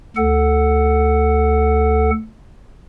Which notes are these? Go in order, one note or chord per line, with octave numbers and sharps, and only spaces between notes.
D2 A4 F#5